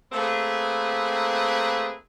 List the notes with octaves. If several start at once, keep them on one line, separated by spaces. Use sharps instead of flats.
A3 A#3 C4 G#4 B4